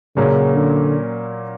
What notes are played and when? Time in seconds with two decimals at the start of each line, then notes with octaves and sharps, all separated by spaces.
0.16 A#2 C#3 F#3 A#3 C#4
0.55 D3